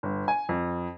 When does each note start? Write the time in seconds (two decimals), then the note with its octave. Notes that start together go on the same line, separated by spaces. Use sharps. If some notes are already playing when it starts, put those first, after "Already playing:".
0.03 G1
0.28 G#5
0.49 F2